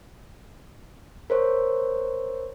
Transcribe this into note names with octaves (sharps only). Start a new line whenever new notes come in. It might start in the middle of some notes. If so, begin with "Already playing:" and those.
A#4 C5 C#5